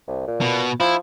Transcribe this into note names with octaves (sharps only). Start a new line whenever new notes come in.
C2
A#2
B2
F3 E4